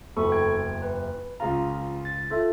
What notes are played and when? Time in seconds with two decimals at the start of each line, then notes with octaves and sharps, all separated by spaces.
0.17 F#1 E2 A4 B5 C#6
0.32 G5 G#6
0.82 B4
1.40 C#2 C#3 F4 A#5
2.05 A6
2.30 F4 A4 E5